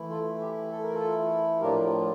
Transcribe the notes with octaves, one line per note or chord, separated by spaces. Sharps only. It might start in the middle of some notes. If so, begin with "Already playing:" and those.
Already playing: E3 A3 E4
F4 A4
G4
A4
A#4
F4 A4
A2 F3 A#3 D4 F4 G4 A#4